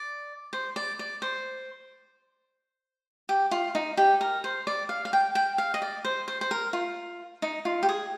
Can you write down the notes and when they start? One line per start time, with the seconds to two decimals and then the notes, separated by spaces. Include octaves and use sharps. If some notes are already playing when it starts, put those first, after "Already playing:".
Already playing: D5
0.53 C5
0.76 D5
0.99 D5
1.22 C5
3.29 G4
3.51 F4
3.75 D#4
3.97 G4
4.21 A#4
4.44 C5
4.67 D5
4.89 F5
5.05 F5
5.13 G5
5.35 G5
5.58 F5
5.74 D#5
5.82 D5
6.05 C5
6.28 C5
6.41 C5
6.51 A#4
6.73 F4
7.42 D#4
7.65 F4
7.83 G4
7.89 G#4